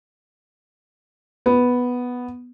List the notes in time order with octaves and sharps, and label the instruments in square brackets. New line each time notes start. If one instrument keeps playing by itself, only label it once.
[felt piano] B3